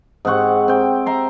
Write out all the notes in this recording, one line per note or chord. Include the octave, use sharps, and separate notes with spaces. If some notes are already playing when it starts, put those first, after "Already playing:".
G#2 C4 F#5 C#6
C4 G5
E5 A#5 C6